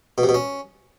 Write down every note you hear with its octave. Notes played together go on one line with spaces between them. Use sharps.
B2
C3
B2
C#4